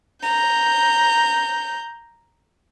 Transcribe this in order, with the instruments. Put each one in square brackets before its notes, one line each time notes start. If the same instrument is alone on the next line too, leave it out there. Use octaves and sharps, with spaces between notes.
[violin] A#5 G6